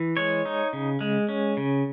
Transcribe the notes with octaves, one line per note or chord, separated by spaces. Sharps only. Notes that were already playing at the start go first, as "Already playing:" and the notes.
Already playing: E3
G#3 C#5
D#4
C#3
G#3
C#4
C#3